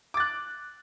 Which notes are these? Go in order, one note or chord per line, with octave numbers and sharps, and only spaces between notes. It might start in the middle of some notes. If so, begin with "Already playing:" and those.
D6 F#6 A6